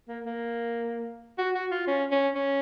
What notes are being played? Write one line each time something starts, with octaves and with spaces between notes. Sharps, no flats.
A#3
A#3
F#4
F#4
F4
C#4
C#4
C#4